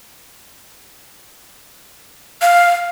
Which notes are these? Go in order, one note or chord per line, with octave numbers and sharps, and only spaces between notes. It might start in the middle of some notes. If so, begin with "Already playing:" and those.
F5